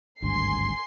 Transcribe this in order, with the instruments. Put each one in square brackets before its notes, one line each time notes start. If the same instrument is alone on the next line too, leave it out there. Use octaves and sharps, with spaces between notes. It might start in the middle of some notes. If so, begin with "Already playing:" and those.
[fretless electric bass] G#1 D2 G2 [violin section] G#5 C6 C7